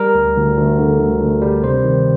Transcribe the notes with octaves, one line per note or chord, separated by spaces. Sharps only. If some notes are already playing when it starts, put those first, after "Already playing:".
Already playing: G3 A#4
D2
D2
D2
D3
D2
D2
G3
C3 C5
D#3